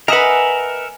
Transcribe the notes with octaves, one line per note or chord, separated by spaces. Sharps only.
A#4 B4 D#5 E5 F#5 G#5